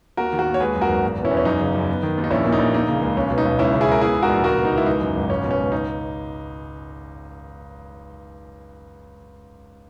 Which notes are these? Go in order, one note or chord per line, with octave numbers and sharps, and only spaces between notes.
D#2 F#4 A#4
D#3
F#4 A#4
D#2
C#5
G#3 G#4 B4
F#2
F#4 A#4
G#1
E2
B2
C#4 E4
E2
C#4
F#2 D#4
C#3
F#2
B3
D#3
D#2
D#4
A#1 C#4 E4
A#2
D#4
A#1
A#3 D#4
C#3
C#2
B1 C#4
B2
D#4
B1
C#2 C#4 E4
C#3
E4 G#4
C#2 A#4
B3 E4 G#4
G#2
F#4 A#4
A#1
C#2 F#4 A#4
B2
D#4
C#2
E4
E3 D#4
F#2
G#1
C#2 C#4
B2
C#4
C#2
D#4